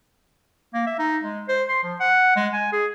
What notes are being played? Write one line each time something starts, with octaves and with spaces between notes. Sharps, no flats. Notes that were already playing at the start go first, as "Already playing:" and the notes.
A#3
E5
D#4
G#3
C5
C6
F3
F#5
G#3
G#5
G#4